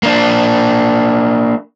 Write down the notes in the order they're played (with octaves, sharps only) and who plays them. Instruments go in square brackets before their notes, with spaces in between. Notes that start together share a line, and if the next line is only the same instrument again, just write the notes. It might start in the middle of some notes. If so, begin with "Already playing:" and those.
[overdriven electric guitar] A#3 D4